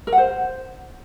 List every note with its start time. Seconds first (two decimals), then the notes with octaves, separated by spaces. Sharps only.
0.07 A#4
0.12 F#5
0.18 C5